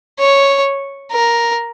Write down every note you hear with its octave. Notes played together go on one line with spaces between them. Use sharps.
C#5
A#4